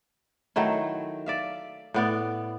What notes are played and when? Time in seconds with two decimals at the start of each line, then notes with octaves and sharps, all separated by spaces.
0.56 D#3 F#3 A3 E4
1.26 D5 E5 F5
1.94 A2 B3 D5